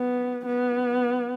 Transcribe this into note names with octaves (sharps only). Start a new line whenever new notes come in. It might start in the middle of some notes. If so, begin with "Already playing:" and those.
Already playing: B3
B3